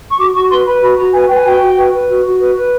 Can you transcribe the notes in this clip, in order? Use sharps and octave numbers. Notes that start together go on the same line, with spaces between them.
C#6
F#4 D6
F#4 C#6
B4 C6
B4 B5
F#4 B5
F#4 A#5
B4 G#5
B4 G5
G#5
F#4 G5
F#4
B4
B4
F#4
F#4
B4
B4